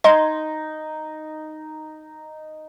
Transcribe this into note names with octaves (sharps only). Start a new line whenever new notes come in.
D#4 D#5 C6 G#6